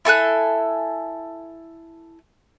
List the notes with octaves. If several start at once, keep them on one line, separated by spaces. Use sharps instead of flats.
E4 A4 G#5 F#6